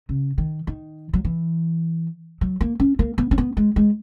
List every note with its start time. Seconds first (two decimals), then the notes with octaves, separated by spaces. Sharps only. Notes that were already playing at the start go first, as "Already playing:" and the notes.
0.09 C#3
0.38 D#3
0.67 D#3
1.13 F#3
1.25 E3
2.41 F#3
2.61 A#3
2.80 C#4
2.99 A#3
3.18 B3
3.31 C#4
3.38 B3
3.57 G#3
3.76 G#3